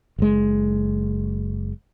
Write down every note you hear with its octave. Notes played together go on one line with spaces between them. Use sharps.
F#1 G#3